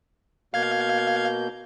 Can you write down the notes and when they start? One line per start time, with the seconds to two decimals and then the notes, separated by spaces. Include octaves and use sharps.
0.54 B2 A#3 F5 G6 G#6